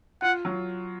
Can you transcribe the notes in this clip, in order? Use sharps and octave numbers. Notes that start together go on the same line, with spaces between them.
F4 F#5
F#3